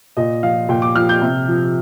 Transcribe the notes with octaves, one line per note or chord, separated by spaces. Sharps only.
A#2 D#5
F3 F5
A#2 G5
D6
F3 F6
G6
C3
F3